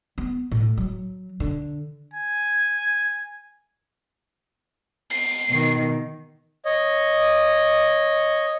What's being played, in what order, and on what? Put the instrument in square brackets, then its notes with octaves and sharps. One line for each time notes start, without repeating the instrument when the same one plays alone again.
[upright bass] B3
A2
F#3
D3
[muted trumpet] G#5
[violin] C7
[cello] B2 D#3
[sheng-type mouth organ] C#5 D#5